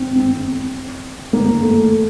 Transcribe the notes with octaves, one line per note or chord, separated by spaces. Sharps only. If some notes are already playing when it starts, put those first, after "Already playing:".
Already playing: C4
C4
A#3
A3